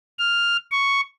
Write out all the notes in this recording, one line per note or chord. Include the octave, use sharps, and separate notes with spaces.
F6
C#6